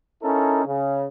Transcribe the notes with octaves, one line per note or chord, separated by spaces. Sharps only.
C#4 D#4 E4 A4 A#4
C#3